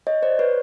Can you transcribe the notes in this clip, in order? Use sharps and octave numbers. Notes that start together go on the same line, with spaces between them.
C#5 D#5
C5 D5
B4 C#5